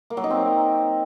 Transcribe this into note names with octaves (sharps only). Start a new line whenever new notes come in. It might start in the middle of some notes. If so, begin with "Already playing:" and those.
A#3
F#3
D#4
C4